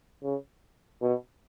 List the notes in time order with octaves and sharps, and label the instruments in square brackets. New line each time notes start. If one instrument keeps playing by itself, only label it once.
[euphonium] C#3
B2